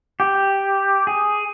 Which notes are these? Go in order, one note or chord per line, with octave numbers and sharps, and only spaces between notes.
G4
G#4